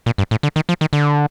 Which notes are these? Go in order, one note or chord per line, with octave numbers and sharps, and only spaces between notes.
A#2
G2
A2
D3
D#3
F3
D#3
D3